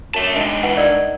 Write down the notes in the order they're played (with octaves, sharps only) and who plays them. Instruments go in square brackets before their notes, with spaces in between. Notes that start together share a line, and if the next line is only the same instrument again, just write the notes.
[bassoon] F#2 [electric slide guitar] D3 E5 A5
[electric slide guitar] G#3 D4 [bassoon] D#4
[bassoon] E3 [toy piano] F#5
[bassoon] D#4 [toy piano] A#4 D5